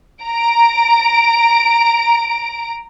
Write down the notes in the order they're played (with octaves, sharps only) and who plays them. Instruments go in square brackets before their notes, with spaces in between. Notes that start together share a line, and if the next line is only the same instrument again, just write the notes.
[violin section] A#5 D7